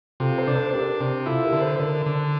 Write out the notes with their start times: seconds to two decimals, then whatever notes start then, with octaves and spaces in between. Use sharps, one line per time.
0.20 C3 F4 A4
0.38 A4 C5
0.47 D4
0.55 A4 C5
0.73 D4 G4 A#4
1.00 C3
1.26 E4 F4 A4
1.44 G4 A#4
1.52 D3
1.61 A4 C5
1.79 D3 A#4 D5
2.06 D3